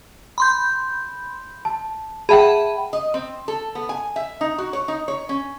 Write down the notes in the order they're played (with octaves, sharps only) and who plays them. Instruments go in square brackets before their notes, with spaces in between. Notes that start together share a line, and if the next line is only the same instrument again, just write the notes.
[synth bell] B5 C6 G6
[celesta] A5
[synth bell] G#4 E5 F#5 [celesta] G5 A5 B5
[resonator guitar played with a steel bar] D#5
C4
A4
B3
G#5
E5
D#4
F#4
C#5
D#4
C#5
C#4